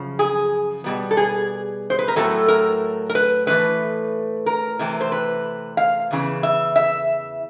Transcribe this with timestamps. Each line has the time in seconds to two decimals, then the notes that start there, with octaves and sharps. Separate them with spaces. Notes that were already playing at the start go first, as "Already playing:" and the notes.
Already playing: F#2 C#3 F3
0.19 G#4
0.84 B2 G3 B3
1.11 A4
1.17 G#4
1.90 C5
1.99 B4
2.08 A#4
2.16 A2 F#3 A3 C4 A4
2.48 A#4
3.10 A#4
3.15 B4
3.47 A2 E3 A3 C4 B4
4.46 A#4
4.79 C3 E3 A3 C4
5.01 C5
5.12 B4
5.77 F5
6.11 E2 C#3 E3
6.43 E5
6.76 E5